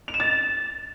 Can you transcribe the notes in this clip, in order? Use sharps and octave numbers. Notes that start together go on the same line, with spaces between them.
F7
E7
A6